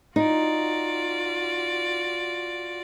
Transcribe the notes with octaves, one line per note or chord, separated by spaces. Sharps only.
D#4 F4 F#4 D5